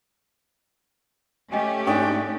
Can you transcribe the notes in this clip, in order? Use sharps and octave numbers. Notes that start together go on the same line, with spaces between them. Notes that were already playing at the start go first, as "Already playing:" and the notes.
A3 C#4 G4 D#5 G5 G#5
G#2 D4 G5 G#5 C#6 D#6